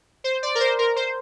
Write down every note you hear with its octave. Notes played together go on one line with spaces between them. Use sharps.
C5
D5
A#4
C5
A#4
C5